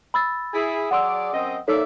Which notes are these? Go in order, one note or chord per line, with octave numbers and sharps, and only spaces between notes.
B5 E6 A6
E4 G#4
F#3 G#4 D5 F#5 C6 E6
F#2 C4 D#5
A#3 D#4 A4 C#5 D5 E5